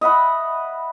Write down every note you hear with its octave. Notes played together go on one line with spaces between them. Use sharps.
D#5 E5 F#5 B5